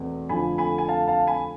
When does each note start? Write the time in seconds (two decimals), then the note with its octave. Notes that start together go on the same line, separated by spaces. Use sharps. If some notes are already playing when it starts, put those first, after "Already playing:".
Already playing: E2 B2 A3 C4
0.29 F2 D3 F3 A3 G#5 B5
0.58 G#5 B5
0.78 G#5
0.88 F5 A5
1.08 F5 A5
1.27 G#5 B5